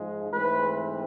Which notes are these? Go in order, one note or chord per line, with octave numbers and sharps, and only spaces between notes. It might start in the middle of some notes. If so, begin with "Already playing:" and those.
Already playing: G#2 F3 G#3
G#2 E3 A3 C4 B4